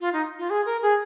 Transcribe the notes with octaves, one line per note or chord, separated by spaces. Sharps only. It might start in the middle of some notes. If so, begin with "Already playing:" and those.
F4
D#4
F4
G#4
A#4
G#4